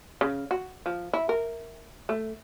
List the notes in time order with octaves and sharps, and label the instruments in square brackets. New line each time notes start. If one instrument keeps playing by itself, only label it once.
[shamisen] C#3
F#4
F3
E4
A#4
A3